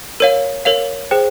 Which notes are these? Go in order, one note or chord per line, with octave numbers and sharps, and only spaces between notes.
A#4 C#5 F5 D#7
A#4 C#5 F5 F7
G#4 C5 G5